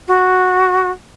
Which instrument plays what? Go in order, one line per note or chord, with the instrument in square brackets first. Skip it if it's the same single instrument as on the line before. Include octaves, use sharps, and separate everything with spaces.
[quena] F#4